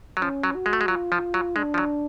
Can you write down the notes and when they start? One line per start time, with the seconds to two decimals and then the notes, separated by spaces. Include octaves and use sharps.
0.17 F#3
0.21 F3 C#4
0.43 F#3
0.55 F#4
0.66 G#3
0.73 A3
0.81 G#3
0.88 F#3 F4
1.12 F3
1.34 F#3
1.56 G#3 D4
1.74 F3
1.78 F#3